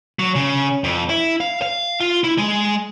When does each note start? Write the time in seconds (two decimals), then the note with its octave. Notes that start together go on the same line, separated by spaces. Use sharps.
0.19 F#3
0.36 C#3
0.84 F2
1.10 E4
1.41 F5
1.62 F5
2.00 F4
2.24 E4
2.38 G#3